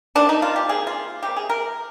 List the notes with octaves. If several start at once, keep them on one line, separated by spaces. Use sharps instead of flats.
C3 D#3 A#3 D4
D#4
F4
G4
C3 G3 A#3 G#4
F4
C3 G3 A#3 G4
G#4
A#4